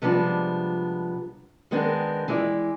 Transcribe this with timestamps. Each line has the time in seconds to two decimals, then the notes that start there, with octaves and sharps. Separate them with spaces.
0.02 C3 F3 G3 G#3 B3 D4
1.71 D#3 G#3 B3 C4 D4 A#4
2.28 E3 G#3 E4 D5